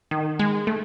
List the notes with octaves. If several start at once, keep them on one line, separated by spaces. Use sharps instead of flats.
D#3
G#3
A3